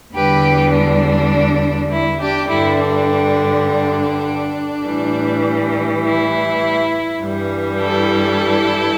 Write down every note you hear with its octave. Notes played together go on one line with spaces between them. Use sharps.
E2 D3 G3 G4 B4
D4
E4
D4 G4
G2 D3 G3 E4
D4
D4
A2 E3 G3
E4
G2 E3 G3
E4 A4